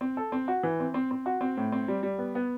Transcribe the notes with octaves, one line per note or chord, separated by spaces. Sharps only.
C4
A4
C4
F#4
E3
C4
C4
C4
F#4
C4
A2
C4
G3
G3
B3
B3